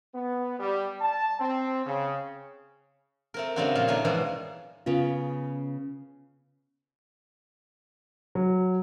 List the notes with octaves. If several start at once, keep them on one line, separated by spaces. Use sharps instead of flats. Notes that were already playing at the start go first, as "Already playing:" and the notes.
B3
G3
A5
C4
C#3
A3 C4 A#4
C#3 G3 A3 C4 D4 F#4
A#2 F3 F4
D#3 A3 A#3 C#4 G#5 A5
G#2 B2 E3 F3 G3
C#3 B3 F4
F#3